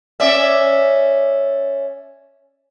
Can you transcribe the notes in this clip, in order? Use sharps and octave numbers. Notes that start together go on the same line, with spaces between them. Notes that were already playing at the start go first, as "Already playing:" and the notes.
C#4 D5 E5